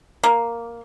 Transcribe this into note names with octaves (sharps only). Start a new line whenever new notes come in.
A#3